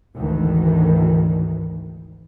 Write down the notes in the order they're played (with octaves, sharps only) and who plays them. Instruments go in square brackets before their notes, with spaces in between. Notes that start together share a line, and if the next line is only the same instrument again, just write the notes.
[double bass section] G#1 D2 G#2 D#3 E3